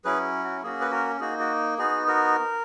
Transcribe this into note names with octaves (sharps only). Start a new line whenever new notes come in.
F#3 C#4 E4 G#4 B4
F#4
A#3 C#4 F#4 G#4
B4
F#4 A#4
A#3 D#4 F#4 G#4
F#4
B3 D#4 F#4 G#4
F#4 A#4